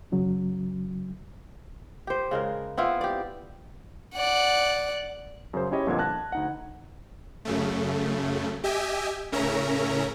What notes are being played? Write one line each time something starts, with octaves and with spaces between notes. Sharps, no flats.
F#2 C#3 F#3
G4 C5
C#3 G#3 A#4
B3 C4 E4 F4
G4 D5
D5 F#5
F#2 C#3 C5
C#4 E4 G4 C#5 D#5
G1 F2 A#2 D4 F#5 G#6
A5 F#6 A#6
D2 D#4 F#5
F#2 C#3 A3
G4 D#5 E5 G5 G#5
A2 C#3 C#4 A#4 E5 A#5